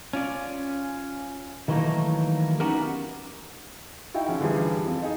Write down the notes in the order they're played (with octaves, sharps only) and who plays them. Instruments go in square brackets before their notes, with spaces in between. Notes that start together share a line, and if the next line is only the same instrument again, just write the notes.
[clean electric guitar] C#4 F4 D5
D#3 E3 F#3 A3 A#3 D#4
B3 C#4 D#4 F#4 G4 A#4
[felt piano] D#4 E4 F#4 E5 G5
C#3 F3 C#4
D3 E3 F3 G3 G#4
F2
D#4 G#4